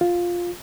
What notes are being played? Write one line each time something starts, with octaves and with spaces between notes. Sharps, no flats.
F4